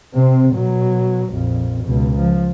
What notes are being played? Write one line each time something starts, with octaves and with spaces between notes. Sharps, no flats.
C3 C4
B2 F#3
A#1 F2
C#2 B2
F3